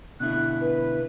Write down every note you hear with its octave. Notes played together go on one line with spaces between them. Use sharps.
B2 D3 E4 F#6
B4